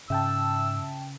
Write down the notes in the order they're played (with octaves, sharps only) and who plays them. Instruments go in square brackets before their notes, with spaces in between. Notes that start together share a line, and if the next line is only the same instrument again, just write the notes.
[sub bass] G#2 [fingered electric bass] C#3 [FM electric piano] E5 G5 A5 [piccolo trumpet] E6